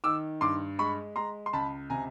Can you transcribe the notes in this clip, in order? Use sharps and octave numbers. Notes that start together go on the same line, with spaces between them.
D#3 D6 E6
G2 C6 D6
G#3 B5 C#6
G#3 A#5 C6
C6
C#2 A5 B5
C3 G#5 A#5